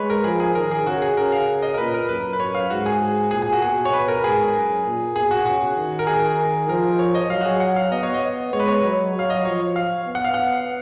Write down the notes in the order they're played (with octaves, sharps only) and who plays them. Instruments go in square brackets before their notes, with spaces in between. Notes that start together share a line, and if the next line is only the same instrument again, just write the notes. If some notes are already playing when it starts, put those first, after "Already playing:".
Already playing: [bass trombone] G#3 [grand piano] B4 C#5
[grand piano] A#4
[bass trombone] F3 [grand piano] G#4
[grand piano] G#4
[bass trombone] D#3 [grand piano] A#4
[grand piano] G#4
[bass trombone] C#3 [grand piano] F#4
[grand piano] G#4
[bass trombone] C#3 [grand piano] A#4
[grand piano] F5
D#5
A#4
[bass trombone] A#2 [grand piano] B4
[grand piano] A#4
[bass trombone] F#2 [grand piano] B4
[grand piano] B4
[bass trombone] F#2 [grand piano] C#5
[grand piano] F5
[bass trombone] G#2 [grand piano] F#4
[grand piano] G#4
[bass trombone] A#2 [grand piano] G#4
[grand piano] G#4
F#4
[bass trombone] B2 [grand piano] G#4
[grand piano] C#5
[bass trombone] B2 [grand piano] B4
[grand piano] A#4
[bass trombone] G#2 [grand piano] G#4
[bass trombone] F#2
A#2
[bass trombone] B2 [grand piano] G#4
[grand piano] F#4
[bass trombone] C#3 [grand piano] F#4
[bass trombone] D#3
[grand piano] A#4
G#4
[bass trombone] F3 [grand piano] A#4
[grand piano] C#5
D#5
[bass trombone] F#3 [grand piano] F5
[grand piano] F#4
G#4
F#5
F5
[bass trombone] B3 [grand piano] D#5
[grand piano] C#5
D#5
[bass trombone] G#3 [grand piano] C#5
[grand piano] B4
C#5
[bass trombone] F#3
[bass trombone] F#3 [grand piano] F5
[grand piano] D#5
[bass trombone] F3 [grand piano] C#5
[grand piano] F5
[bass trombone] B3
[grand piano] F#5
F5
F#5